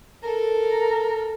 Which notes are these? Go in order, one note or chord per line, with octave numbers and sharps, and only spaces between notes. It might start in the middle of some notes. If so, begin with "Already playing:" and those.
A4 A#4